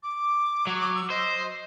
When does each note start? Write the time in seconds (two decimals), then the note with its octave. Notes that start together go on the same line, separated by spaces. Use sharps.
0.03 D6
0.67 F#3
0.95 E6
1.10 C5 D#5